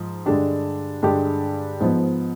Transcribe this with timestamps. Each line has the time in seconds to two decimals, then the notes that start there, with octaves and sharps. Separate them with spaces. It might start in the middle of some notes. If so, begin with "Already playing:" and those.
Already playing: G#2 F3
0.26 G2 D3 G#3 D4 G4
1.03 G2 D3 G#3 D4 G4
1.80 G#2 F3 B3